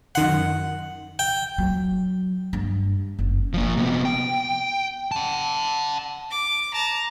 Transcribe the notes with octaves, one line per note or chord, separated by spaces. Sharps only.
F#2 D#3 F#5 C6
G5
F#3
G2
F#1
F3 A#3
C3 B3
G5
F#5 A5
D6
A5 A#5